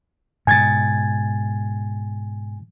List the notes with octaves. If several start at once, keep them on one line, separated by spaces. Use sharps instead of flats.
G#2 B2 G#5 G#6 A6